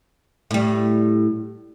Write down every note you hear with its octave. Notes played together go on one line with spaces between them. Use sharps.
A2 G3